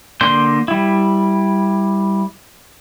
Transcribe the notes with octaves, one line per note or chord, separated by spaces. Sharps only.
D3 A#3 D4 C6 G6
G3 E4